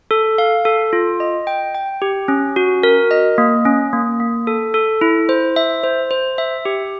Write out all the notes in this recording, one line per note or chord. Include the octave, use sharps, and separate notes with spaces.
A4
F5
A4
F4
D#5
G5
G5
G4
C#4
F#4
A#4
D#5
A#3
C#4
A#3
A#3
A4
A4
E4
C5
E5
C5
C5
E5
G4